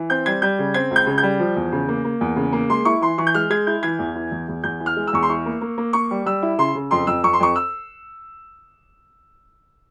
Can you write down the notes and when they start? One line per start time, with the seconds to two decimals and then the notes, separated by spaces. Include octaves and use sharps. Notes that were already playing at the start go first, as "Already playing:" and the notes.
Already playing: E3
0.10 C4 G6
0.26 G3 G#6
0.42 G3 G6
0.59 C#3
0.74 C4 G#6
0.91 C#2
0.96 G6
1.07 C#3
1.18 G6
1.23 G3
1.39 F3
1.56 E2
1.72 C#3
1.88 A#3
2.05 A#3
2.21 E2
2.36 C#3
2.53 A#3
2.70 G#3 C6
2.85 E4 C#6
3.02 E3 C6
3.18 E3 C#6
3.27 G6
3.34 G#3 F6
3.50 G#3 G#6
3.67 E4 G6
3.83 E3 G#6
3.99 E2
4.16 E3
4.31 E2
4.48 E2
4.64 E2 G6
4.80 E3
4.86 F6
4.96 G#3
5.07 E6
5.13 E2 C#6
5.22 C6
5.29 E4 C#6
5.46 A#3
5.61 A#3
5.78 A#3
5.93 A#3 C#6
6.11 G3
6.26 G3 E6
6.43 E4
6.58 C#3 C6
6.75 C#3
6.91 F2 C6
7.07 F2 E6
7.23 F2 C#6
7.33 C6
7.40 F2 C#6
7.56 E6